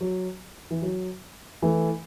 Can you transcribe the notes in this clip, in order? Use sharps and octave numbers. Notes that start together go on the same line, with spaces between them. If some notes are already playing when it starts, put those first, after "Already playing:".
F#3
E3
F#3
E3 A3